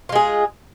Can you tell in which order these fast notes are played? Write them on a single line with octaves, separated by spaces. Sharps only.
F4 G#3 G#4